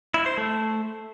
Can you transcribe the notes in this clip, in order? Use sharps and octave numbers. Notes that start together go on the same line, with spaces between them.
E4
C5
A3